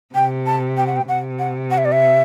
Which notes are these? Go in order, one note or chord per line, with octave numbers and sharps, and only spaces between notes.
C3 G5
A5
G5
F#5
G5
C3 F#5
F#5
F#5
E5
D5
E5